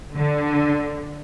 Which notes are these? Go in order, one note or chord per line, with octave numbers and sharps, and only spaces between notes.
D3